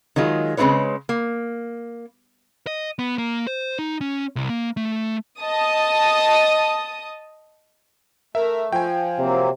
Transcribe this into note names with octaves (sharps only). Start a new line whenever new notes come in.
D#3 F#3 G#3 F4
C#3 G#3 C4 E4 B4 C#5
A#3
D#5
B3
A#3
C5
D#4
C#4
C2
A#3
A3
D#5 A5 D#6
A3 A#4 E5
F3 G5 G#5
C3 F#3 A#3 C4